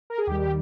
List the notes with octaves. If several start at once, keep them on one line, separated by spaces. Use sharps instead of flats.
A#4
G#4
D#2 D#3 G3 G4
G4